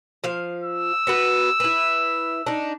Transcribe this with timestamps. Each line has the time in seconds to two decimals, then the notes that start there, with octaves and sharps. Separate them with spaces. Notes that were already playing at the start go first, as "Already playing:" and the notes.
0.24 F3 F5
0.64 E6
1.07 B3 F#4 B4
1.60 E4 B4
2.46 D4 D#4